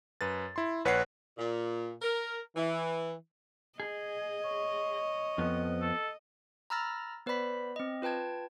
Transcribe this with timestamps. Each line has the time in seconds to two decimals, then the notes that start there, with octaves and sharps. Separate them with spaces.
0.21 F#2 B4 A6
0.56 E4 C6
0.85 A#1 B4 C#5 F#5 F#6 C7
1.38 A#2
2.01 A#4
2.55 E3
3.80 G#4 D#5
4.45 C#5
5.38 F2 F3 B3
5.81 A4
6.70 A#5 B5 E6 F6 A6 A#6
7.26 B3 B4 C5 D5 B5 B6
7.76 C4 D#5
8.02 F4 B4 G5 A5 G#6